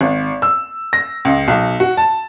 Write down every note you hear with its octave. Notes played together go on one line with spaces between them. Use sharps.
G#1
E6
A#6
C#2
B1
F#4
A5